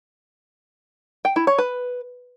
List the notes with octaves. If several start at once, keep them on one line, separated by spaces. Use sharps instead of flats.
G5
E4
C#5
B4